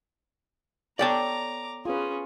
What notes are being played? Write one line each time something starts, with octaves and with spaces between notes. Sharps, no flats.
B3 A4 C#5 D5 G5 A5 A#5 D6
C#4 F4 G#4 B4